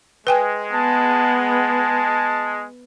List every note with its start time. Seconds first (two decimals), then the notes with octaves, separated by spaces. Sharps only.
0.27 G#3 B4 G5 G#5
0.74 B3 A5
1.46 A5